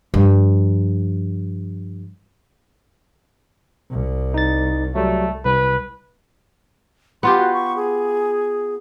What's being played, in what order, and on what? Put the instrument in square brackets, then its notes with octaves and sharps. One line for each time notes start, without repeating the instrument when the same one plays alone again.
[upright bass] G2 F3
[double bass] C2
[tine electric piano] D#4 A6
[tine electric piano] F#3 G3 [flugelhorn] A3
[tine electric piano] C2 [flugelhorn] B4
[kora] B3 F4 G4 [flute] C6
[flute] F#4
C#6
G#4